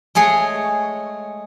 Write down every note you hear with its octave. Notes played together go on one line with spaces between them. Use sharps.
G#3 A3 G#4 C#5